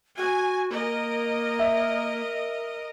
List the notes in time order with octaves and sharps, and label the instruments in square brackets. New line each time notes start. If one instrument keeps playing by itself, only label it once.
[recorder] F#4 [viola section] G#5
[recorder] A#3 [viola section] A#4 D#5
[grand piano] E5